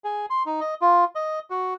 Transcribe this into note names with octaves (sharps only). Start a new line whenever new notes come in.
G#4
C6
D#4
D#5
F4
D#5
F#4